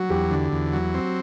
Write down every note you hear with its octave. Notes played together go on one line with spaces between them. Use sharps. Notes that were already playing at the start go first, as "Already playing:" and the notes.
Already playing: F#3 F#4
E2 G4
D3
E2
F#3
C4